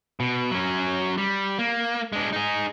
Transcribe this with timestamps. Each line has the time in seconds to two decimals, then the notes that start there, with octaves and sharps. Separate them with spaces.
0.20 B2
0.51 F#3 C#4
1.18 G3
1.59 A#3
2.13 G#3 D4
2.32 D#4 G#4